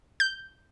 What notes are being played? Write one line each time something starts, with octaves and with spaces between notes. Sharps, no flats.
G6